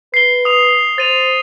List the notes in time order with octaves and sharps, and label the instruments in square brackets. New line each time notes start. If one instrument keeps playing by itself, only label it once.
[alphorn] B4 [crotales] C7 G7
[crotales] D#6 F7
[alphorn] C5 [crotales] A6 D#7 F7